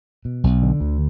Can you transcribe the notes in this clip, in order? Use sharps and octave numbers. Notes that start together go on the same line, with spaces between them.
B2
B1
D3
D2